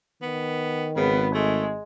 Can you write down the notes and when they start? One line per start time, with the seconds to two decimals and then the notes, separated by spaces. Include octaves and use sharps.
0.22 D#3 B3
0.97 G#1 C#3 B3
1.34 G#3 A3